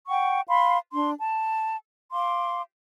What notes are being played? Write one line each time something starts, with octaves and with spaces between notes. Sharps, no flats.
F#5 G5 C#6
F5 B5 C6
D4 C6
A5
F5 C6 D6